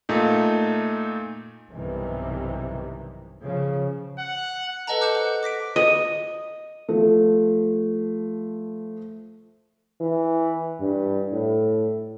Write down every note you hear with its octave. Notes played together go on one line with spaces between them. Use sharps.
A#2 A3 D#4
B1 G2 C3 D#3 E3 G3
C#3 F3
F#5
A4 B4 D#5 F#5 A5 A#5
D6 F#6 G6 C#7 E7
C5 F#5
D6 A#6 B6 D7
D#5
F3 A3
E3
G2
A2